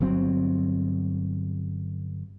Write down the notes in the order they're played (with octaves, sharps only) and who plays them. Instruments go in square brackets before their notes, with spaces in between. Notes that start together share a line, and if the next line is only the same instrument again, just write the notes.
[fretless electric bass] G1 F#3 C4